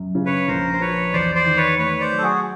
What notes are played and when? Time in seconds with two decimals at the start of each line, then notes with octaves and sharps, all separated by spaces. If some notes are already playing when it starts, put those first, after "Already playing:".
Already playing: F#2
0.15 C#3
0.26 B4 C#5
0.48 A#1 A#4 C5
0.73 C5
0.81 F3 B4 C#5
1.13 E2 C5 D5
1.35 C5 D5
1.46 D#3
1.57 B4 C#5
1.79 A3 B4 C#5
2.00 C5 D5
2.12 F#3
2.18 A4
2.22 F#4 G#4